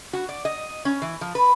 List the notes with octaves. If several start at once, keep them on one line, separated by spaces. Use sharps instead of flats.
F#4
D5
D#5
C#4
E3
F3
B4